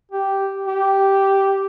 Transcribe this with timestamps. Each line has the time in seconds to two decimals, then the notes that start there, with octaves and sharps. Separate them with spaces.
0.12 G4
0.68 G4